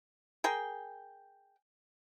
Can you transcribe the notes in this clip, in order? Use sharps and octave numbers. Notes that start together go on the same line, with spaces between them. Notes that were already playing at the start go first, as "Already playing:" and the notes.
G#4 A#4 G5